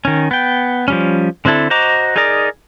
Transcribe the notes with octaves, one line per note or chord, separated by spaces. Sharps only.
D#3 C#4
B3 G5
F3 G3 C#4
D3 C4 D4 E4 A4
F#4 C5 D#5 A#5 D6
D#4 G#4 A#4 D5 A#5